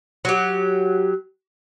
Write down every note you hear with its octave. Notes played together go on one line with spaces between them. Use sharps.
F#3 G4